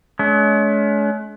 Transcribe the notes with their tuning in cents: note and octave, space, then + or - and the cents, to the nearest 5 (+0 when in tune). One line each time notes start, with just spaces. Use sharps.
G#3 +45 C#4 +40